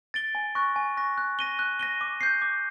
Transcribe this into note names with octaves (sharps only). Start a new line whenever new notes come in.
A6 D7 G7
G#5
C#6 F#6 A#6
G#5
C#6 F#6 A#6
F#6
A#6 D#7 G7
F#6
A#6 D#7 G7
D6
G6 C7
D6